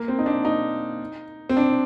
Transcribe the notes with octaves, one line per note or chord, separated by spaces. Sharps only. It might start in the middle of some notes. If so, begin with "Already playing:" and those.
Already playing: A#3
C4
D#4
D4
D#4
C4
D4